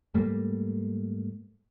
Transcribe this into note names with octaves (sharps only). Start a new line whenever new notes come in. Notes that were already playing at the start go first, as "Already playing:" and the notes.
G#2 G3 A3 A#3